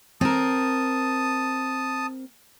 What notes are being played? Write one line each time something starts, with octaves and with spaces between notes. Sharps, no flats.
C4 A#4 A5 D#6